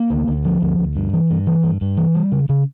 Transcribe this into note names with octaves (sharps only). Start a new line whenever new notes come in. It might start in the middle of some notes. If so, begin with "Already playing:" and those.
Already playing: A#3
D2
D2
F3
D2
D2
G2
E3
G2
E3
G2
G2
E3
G3
C#3
C#3